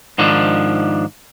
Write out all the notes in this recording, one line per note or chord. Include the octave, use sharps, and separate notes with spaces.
G#2 D#3 F3 D4